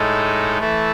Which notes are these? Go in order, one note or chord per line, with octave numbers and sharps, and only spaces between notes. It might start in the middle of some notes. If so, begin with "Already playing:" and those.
Already playing: A2 G#3 D#4 A4
E3 A3 E4 A4